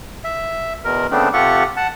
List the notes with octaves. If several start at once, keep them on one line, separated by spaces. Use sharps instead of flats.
E5
E2 B2 A#4
C#3 A3 B3 C4 D4
C3 F4 G4 A4 F#5 C#6
F#5 A5